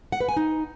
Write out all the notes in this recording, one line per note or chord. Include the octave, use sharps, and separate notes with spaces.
F#5
B4
G#5
D#4